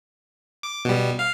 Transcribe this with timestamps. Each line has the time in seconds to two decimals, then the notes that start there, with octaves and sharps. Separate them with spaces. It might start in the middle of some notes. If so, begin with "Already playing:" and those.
0.63 D6
0.85 B2 G3
1.19 F5